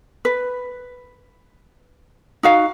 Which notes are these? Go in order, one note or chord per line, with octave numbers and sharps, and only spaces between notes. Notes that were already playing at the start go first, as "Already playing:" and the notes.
B4
D#4 F#4 F5